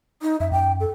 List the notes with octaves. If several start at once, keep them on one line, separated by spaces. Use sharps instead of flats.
D#4
F#2 E5
F#2 G5
A4